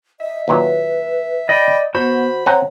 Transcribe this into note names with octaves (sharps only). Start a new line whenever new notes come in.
D#5 E5
D#2 A#2 F#3 B4
D5 D#5 G5 B5
B3 F#4 C5 B5
C4 C#5 F#5 A#5